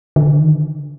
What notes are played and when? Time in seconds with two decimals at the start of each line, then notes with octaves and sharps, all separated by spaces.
0.16 D3
0.40 D#3
0.52 D3